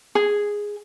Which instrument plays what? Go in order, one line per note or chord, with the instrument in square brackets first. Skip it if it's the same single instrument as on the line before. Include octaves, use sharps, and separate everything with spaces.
[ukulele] G#4